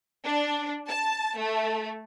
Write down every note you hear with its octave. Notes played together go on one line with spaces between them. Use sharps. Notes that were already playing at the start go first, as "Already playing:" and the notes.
D4
A5
A3